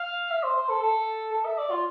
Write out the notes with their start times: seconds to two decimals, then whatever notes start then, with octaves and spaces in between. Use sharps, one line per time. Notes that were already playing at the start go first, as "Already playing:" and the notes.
Already playing: F5
0.31 E5
0.43 C5
0.56 C5
0.69 A4
0.82 A4
1.33 A4
1.45 E5
1.58 D5
1.71 F4